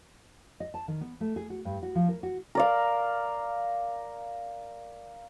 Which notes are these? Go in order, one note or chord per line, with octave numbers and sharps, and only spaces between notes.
D#5
A5
D#3
B3
A3
G#4
F#4
G2
F#4
F3
A#4
F#4
A#4 D5 F5